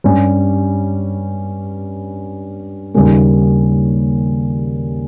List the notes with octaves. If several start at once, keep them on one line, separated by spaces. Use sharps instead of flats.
G2 G3 C#4 G4
D#2 C#3 G3 A#3 C#4